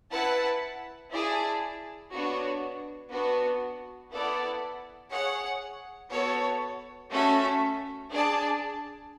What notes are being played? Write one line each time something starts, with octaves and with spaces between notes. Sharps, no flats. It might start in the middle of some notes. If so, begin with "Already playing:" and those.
E4 B4 F#5 A5
E4 G#4 D5 A5
B3 D4 F#4 C#5
B3 D4 F#4
B3 E4 A4 D5 F#5
G#4 C#5 F#5
B3 F#4 A4 C#5
A3 C#4 F#4 A4 E5
D4 G#4 D5 A5